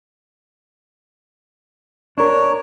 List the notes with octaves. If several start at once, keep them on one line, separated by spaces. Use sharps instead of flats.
D4 A#4 C#5